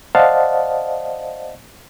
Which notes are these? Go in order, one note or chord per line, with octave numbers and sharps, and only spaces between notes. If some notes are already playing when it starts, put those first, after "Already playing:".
C5 D5 D#5 F5 F#5 A5